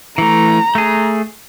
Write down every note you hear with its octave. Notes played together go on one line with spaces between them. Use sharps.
E3 A3 A#5
A3 G#4